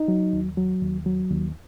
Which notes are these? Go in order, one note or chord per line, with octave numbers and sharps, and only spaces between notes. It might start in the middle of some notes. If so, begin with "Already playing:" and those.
Already playing: D#4
F#3
D#2
F#3
D#2
F#3
D#2